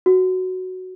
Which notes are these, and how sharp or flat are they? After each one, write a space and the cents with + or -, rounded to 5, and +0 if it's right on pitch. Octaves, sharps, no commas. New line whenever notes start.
F#4 +5